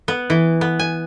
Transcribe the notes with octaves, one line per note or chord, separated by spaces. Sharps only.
B3
E3
B3
G#5